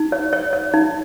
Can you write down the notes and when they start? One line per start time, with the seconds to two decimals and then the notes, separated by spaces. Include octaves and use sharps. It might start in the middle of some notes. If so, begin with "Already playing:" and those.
Already playing: D#4
0.12 C#5
0.33 C#5
0.53 C#5
0.74 D#4